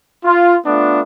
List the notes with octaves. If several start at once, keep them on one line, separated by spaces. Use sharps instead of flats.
F4
A3 B3 D4 F4